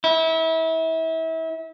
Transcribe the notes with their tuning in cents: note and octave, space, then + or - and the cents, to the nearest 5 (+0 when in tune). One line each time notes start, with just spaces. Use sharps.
E4 -30